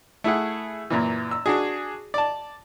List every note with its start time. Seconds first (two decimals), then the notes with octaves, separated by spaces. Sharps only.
0.24 A3 E4 G#4 F#5
0.90 F#2 A#2 E3
1.31 E6
1.46 D4 F#4 G#4
2.14 D5 A5